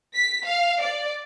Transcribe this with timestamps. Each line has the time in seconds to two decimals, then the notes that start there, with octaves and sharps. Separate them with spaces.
0.16 B6
0.46 F5
0.82 D5